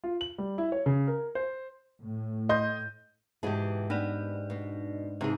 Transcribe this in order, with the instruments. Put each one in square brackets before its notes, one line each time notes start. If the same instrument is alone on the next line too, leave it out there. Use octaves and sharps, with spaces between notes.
[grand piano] F4
F#7
G3
E4
C#5
C#3
A#4
C5
[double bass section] A2
[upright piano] D#5 C6 G6
[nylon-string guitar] E2 B2 E3 [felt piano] G#2 [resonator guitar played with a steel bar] G4 G#4
[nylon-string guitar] B3 [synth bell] D4 D#4 D5
[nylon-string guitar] B2
[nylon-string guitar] G#2 E3 [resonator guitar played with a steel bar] C3 G#4